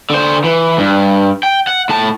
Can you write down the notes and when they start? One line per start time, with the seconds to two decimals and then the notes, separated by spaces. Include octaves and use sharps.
0.10 D3 C5
0.44 E3
0.78 G2
1.43 G5
1.67 F#5
1.89 A2 A5